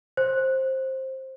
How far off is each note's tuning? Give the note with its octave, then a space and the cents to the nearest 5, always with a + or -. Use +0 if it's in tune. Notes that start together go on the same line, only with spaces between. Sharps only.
C5 +15